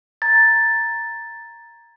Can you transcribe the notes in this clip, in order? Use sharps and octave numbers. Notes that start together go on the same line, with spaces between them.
A#5 G#6 A6